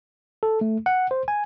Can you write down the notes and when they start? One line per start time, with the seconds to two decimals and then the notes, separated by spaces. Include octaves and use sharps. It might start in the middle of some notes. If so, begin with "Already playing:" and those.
0.43 A4
0.61 A3
0.86 F#5
1.11 C5
1.28 G#5